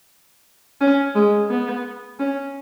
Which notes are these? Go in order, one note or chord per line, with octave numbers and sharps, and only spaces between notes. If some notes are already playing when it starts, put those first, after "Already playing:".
C#4
G#3
B3
C#4